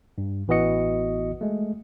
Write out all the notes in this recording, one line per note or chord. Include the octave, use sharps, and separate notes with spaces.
G2
A1 E3 B3 F#4 D#5 C#7
G#3 A3